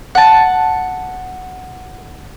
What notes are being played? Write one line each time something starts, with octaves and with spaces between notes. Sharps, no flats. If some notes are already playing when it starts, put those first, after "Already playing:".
F#5 A5